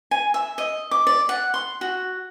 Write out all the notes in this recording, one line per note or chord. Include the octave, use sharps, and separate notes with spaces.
G#5
E5
D#5
D6
D5
F#5
C6
F#4